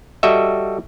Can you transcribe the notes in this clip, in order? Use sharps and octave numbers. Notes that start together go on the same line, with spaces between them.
G3 F#4 A4 D#5 E5